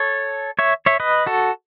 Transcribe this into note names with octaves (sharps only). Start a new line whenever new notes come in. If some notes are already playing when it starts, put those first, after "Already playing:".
Already playing: A4 C#5
C#5 E5
C#5 E5
B4 D#5
F#4 A4